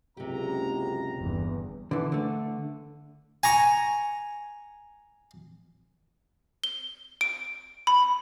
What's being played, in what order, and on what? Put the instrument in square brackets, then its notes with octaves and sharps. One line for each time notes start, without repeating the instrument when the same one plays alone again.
[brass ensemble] F#1 C#2 A#5 [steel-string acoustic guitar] C3 G4
[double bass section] G1 E2
[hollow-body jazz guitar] D3 E3
D3 A3
[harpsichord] G#5 A#5 C#6
[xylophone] G7
D7
B5